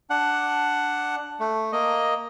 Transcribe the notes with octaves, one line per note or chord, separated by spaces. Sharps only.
D4 F#5
A3
A#3 D#5